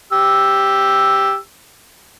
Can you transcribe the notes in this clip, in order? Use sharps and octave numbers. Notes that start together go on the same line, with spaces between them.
G4 E6